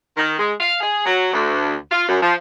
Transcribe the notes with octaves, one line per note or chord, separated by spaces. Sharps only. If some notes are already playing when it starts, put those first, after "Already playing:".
D#3
G#3
F5
G#4
F#3
D2
F4
F#2
F3